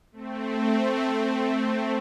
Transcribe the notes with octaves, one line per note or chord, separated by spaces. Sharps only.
A3 C4